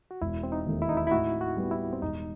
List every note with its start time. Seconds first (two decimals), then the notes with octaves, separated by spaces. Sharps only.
0.11 F#4
0.21 E1 E4
0.43 C4
0.52 D#4
0.66 D#2 D#3 A3
0.82 E4
0.89 D#4
0.97 E4
1.07 E4
1.11 A2 F#4
1.41 F#4
1.57 G3 B3
1.71 E4
1.93 C4
2.02 E1 D#4